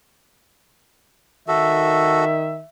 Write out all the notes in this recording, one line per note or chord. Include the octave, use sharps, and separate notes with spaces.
D#3 F#4 A4 E5